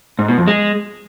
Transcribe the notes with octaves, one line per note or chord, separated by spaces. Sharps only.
G#2
B2
F2
G#3